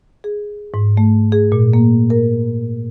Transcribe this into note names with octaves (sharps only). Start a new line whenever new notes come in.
G#4
G#2
A3
G#4
A#2
A#3
A#4